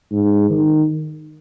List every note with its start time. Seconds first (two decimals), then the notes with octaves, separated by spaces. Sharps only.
0.12 G#2
0.50 D#3